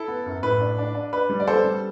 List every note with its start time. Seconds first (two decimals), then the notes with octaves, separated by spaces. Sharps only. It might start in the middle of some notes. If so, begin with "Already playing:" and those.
Already playing: E4 A4
0.08 B3
0.26 F#2
0.43 A2 B4
0.61 D4
0.79 D4
0.95 D4
1.13 D4 B4
1.30 G3
1.40 D5
1.47 B3 A4 C5
1.64 G3